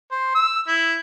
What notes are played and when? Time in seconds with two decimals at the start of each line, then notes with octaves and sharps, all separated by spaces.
0.11 C5
0.35 E6
0.68 E4